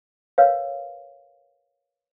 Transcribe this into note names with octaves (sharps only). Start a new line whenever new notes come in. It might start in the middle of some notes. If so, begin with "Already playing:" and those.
A#4 B4 C#5 F5